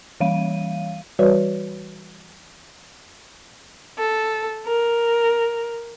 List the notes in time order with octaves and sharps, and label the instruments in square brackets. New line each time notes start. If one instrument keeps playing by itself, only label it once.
[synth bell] E3 G3 F5 D#7
[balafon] E3 G3 F#4 B4 C#5 D5
[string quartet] A4
A#4